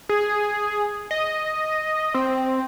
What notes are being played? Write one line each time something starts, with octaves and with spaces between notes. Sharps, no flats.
G#4
D#5
C4